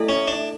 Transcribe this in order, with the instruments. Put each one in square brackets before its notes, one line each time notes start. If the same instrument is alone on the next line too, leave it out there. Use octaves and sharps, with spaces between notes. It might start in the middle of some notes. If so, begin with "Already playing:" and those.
Already playing: [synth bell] A3 E4 A4 E5
[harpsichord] C#4
D4